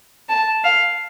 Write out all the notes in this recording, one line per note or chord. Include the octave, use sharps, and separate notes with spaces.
A5
F5